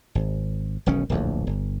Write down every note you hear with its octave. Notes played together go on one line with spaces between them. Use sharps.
G#1
E1 B1 D#3 C#4
D1 A#1 E2
G1